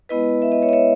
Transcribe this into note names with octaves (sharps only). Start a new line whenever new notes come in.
G#3 B3 E4 B4 D#5
E5
D#5
C#5 E5
D#5
C#5 E5